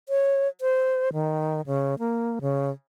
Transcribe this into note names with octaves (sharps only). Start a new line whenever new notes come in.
C#5
C5
D#3
C#3
A#3
C#3